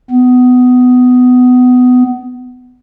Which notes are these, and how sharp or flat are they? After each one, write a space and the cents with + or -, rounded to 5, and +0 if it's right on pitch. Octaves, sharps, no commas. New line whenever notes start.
B3 +20